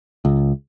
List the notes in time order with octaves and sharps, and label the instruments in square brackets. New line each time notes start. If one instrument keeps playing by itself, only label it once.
[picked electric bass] C#2